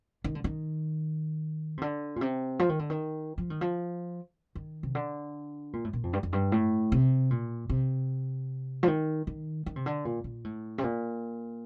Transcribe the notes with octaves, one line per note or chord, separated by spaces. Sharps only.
D#3
D3
D#3
C3
D3
A#2
C3
F3
D#3
D3
D#3
F3
D#3
F3
D#3
C3
D3
A#2
A2
A#2
F2
G2
F2
G2
A2
C3
A#2
C3
F3
D#3
D#3
D#3
C3
D3
A#2
A#2
A2
C3
A#2